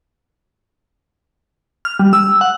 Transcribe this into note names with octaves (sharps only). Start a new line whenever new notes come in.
F6
G3
E6
F#5